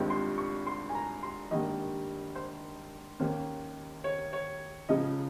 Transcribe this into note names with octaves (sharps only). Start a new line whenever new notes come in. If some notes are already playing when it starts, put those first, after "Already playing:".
Already playing: G#1 G2 F3 G#3 C4
C6
C#6
C6
G#5
A#5
C6
G#1 G2 D#3 A#3 D#5
C5
D#2 D#3 A#3 C#4 C5
C#5
C#5
C#2 C#3 F3 D#5